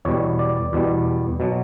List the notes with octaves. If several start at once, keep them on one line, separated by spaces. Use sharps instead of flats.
E2 B2 G3 C#5
D5
E2 B2 G3
B2 F#3